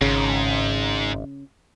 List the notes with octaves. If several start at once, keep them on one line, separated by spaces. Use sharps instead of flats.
G#1 G#2 C#3